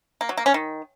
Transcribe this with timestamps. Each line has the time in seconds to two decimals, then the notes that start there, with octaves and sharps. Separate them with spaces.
0.21 A#3
0.29 F#3
0.37 A#3
0.46 C#4
0.54 D#3